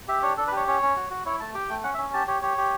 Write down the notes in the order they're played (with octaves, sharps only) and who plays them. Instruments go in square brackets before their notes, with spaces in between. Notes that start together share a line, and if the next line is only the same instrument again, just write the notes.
[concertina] G4 E5
D4 C#5
D4 A4
B4
G4 C#5
C#4 C#5
C#4
F#4
F#4
E4 C#5
A3 A5
G4 G5
A3
C#4 F#5
E5
C#4
G4 A5
G4 C#5
G4 C#5
G4